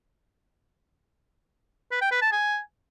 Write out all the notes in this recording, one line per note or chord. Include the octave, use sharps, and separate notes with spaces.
B4
G5
B4
A5
G#5